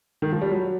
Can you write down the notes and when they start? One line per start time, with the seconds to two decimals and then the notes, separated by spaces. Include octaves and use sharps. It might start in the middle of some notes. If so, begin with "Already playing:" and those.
0.22 D#3
0.32 F3
0.42 G3
0.51 F#3